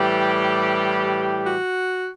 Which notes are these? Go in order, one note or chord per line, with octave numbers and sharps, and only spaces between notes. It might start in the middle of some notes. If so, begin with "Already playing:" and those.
Already playing: A2 E3 G3 G4
F#4